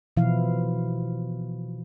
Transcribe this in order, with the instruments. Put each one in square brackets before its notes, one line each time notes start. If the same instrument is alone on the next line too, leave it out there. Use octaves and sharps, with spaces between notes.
[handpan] B2 E3 F3 E4 F5